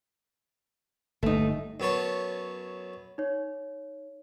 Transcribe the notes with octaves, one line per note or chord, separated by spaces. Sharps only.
G1 A3 D#4
F#2 B3 C#5 A5
D#4 C#5